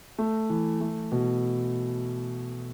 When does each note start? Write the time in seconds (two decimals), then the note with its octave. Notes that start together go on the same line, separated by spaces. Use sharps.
0.18 A3
0.49 E3
0.80 A3
1.11 B2